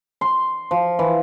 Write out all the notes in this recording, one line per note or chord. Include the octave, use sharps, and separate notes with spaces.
C6
F3
E3